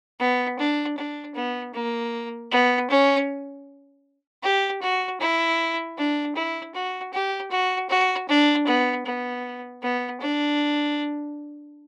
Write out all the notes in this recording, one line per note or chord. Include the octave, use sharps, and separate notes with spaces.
B3
D4
D4
B3
A#3
B3
C#4
G4
F#4
E4
D4
E4
F#4
G4
F#4
F#4
D4
B3
B3
B3
D4